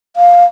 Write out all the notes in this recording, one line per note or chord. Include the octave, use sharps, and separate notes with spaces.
F5